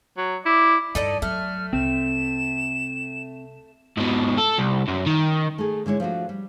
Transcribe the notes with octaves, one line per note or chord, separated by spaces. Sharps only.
F#3
E4 D5
G2 D#4 A4 D5 D#7
F#3 A3 F6
C2 C4 E7
G#2 B2
A4
C2
F#2
D#3
A3 G#4
D3 G#3 E4 C#5
F3 A3 D4 F#4
G3